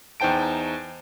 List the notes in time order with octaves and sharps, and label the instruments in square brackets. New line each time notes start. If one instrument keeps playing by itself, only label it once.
[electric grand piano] E2 D#4 C5 G5 A5 D7